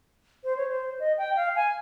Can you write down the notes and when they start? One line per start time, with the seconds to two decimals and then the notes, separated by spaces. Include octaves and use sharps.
0.44 C5
0.57 C#5
0.68 C5
1.00 D#5
1.17 G5
1.36 F5
1.56 G#5